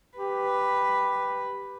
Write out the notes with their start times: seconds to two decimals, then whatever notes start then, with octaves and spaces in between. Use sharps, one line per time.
0.18 G4 B4